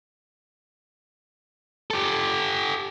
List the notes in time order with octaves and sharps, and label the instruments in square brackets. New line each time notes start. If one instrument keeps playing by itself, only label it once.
[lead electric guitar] G4 A4